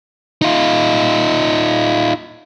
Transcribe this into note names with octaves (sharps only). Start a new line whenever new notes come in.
D#4 F4